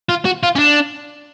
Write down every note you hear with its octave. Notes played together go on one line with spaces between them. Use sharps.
F4
F#4
F4
C#4
D4